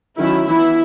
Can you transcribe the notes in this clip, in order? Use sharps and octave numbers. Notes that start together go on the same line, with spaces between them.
D#3 F#3 C#4 E4
E3 B3 E4